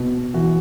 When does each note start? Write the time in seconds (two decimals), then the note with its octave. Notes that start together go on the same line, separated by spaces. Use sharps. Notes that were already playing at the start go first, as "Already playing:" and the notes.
Already playing: B2
0.34 E3 F#4